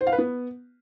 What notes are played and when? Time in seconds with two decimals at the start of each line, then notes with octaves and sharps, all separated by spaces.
0.01 C5
0.07 F5
0.12 B4
0.18 B3